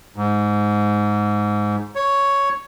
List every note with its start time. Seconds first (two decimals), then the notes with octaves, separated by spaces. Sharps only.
0.16 G#2
1.95 C#5